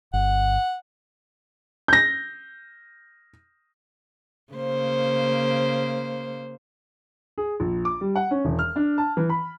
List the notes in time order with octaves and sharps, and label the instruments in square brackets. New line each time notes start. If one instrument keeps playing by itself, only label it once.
[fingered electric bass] G1 [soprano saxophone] F#5
[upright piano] G6 A#6
[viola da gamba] C#3 A#3 C5
[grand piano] G#4
A#1
D6
G3
F#5
C#4
E1
F6
D4
A5
E3
B5